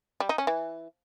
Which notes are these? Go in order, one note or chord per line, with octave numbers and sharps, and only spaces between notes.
G3
D#4
C#4
E3